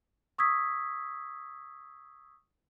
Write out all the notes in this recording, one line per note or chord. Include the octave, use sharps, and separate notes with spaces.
C#6 D#6 E6 G#6 B6